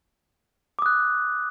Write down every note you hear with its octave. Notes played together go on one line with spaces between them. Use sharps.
D6 D#6 F#6